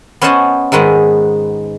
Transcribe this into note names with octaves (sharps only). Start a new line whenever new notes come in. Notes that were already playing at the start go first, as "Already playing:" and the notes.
B3 C#4 C5 D#5 F#5 A5
G#2 D#3 G#3 B3